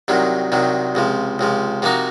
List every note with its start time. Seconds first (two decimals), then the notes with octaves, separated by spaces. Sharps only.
0.08 C2 C3 D#3 F#3
0.52 C2 C3 D#3 F#3
0.95 C#2 C3 F3
1.39 C#2 C3 F3
1.82 C3 F3 A#3 D#4 F#4